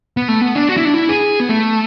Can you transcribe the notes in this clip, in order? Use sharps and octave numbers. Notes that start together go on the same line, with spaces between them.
B3
A3
B3
D4
F#4
E4
D4
E4
G#4
B3
A3